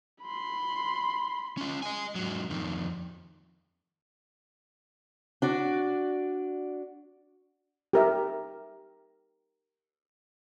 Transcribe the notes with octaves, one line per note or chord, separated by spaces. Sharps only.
B5 C6
C#4 F4
D#5 G#5
G#2 F#3
F2 D#3
D4 F#4 D5
G4 A#4 E5